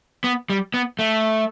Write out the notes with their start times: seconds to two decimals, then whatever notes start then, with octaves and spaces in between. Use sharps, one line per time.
0.24 B3
0.50 G3
0.74 B3
0.99 A3